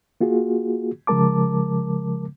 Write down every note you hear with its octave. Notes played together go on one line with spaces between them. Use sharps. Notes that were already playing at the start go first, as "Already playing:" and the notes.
A#3 F4 F#4 G#4
C#3 F3 G#3 A#4 A5 D6